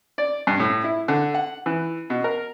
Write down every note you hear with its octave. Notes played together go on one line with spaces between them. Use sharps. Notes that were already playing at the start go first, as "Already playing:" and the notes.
D5
G2
A2
E4
D3
F#5
E3
B2
A#4